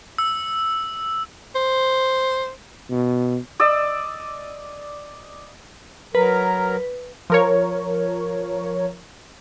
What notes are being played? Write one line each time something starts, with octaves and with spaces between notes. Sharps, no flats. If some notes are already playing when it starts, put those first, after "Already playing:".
E6
C5
B2
D5 D#5 E6
F#3 A#4 B4
F3 A#4 C#5